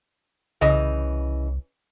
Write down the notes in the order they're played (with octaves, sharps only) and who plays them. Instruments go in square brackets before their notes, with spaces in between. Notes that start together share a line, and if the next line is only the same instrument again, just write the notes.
[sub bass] C2 [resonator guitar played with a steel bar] C#3 E3 D#5